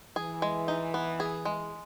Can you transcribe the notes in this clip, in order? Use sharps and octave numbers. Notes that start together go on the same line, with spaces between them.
E3 G#4
G#3
D#4
B3
G#4
G#3